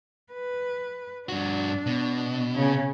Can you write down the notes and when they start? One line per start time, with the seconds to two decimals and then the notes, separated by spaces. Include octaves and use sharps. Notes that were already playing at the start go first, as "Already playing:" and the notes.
0.33 B4
1.29 G2 D4 F#4
1.86 B2
2.55 C#3 C#4